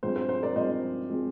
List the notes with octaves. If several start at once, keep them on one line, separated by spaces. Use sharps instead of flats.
G2 F3 G#3 C4 C5
C5
C5
A#4 D5
G2 F3 G#3 C4 C5 D#5
F3 G#3 C4